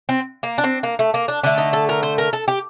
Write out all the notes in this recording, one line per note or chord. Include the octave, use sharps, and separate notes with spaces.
C4
A#3
D4
C4
A#3
A3
A#3
D4
D3 A3 D4
D#4
A4
A#4
C5
A#4
A4
G4